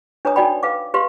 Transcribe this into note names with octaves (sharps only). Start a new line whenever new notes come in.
D4 B4 C#5 A#5 D#6
D4 D#4 F#4 D5 G5 B5
B4 F5 D6
G4 B4 F5 C6